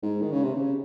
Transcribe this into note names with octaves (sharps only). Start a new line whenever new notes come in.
G#2
D#3
C#3
C3
C#3